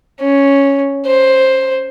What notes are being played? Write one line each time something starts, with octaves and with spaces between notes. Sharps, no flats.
C#4
C5